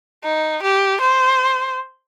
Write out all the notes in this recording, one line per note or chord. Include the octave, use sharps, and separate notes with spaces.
D#4
G4
C5